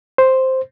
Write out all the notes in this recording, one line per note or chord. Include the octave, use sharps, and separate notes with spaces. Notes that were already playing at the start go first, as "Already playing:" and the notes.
C5